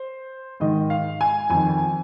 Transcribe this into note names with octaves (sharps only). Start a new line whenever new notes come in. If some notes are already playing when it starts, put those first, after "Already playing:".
Already playing: C5
G#2 D#3 D#5
F5
G#5
F2 D#3 G#5